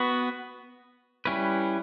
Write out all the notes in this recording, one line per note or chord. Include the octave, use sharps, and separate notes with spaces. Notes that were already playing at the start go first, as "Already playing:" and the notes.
Already playing: B3 F#4 B4
G3 C#4 E4 B4